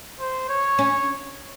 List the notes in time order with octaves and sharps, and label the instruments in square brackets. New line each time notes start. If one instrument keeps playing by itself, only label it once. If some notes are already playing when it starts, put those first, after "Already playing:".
[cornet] C5
C#5
[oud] C#4